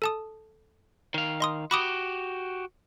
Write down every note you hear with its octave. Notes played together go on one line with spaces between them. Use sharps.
A4 A5 D#6
D#3 F5
D#5 C6 D#6
F#4 G4 B5 D6 D#6